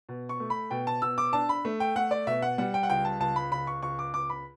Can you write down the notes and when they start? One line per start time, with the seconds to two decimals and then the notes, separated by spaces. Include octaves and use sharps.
0.09 B2
0.29 C#6
0.40 A3
0.50 B5
0.71 B2 G5
0.87 A5
1.02 B2 E6
1.18 D6
1.33 D4 A5
1.49 B5
1.65 A3
1.80 G5
1.96 A3 F#5
2.11 D5
2.27 B2 E5
2.42 F#5
2.58 G3 F#5
2.74 G5
2.83 F#5
2.90 C#2 G5
3.05 A5
3.20 C#2 A5
3.36 B5
3.52 C#2 B5
3.67 C#6
3.83 C#2 C#6
3.99 D6
4.14 C#2 D6
4.30 B5